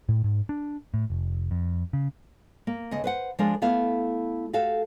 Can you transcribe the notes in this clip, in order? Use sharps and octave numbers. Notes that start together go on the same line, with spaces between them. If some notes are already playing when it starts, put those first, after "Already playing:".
A2
G#2
D4
A2
F1
F2
C#3
A#3
D2 C#3 D#5
B4 C5 F#5
F3 G#3 D4 F4 A#4
A3 B3 E4 F5
F#4 G4 A4 F5